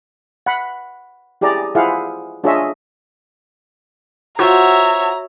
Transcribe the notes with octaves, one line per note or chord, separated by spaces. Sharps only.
F#5 B5
E4 G4 G#4 D5 A#5
E4 F4 G#4 C5 F5 F#5
D4 F4 G#4 C#5 D#5 E5
F4 F#4 C5 C#5 E5 F#5 A#5